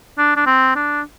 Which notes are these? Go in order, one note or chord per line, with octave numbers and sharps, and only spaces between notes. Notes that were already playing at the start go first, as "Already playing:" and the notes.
D4
D4
C4
D4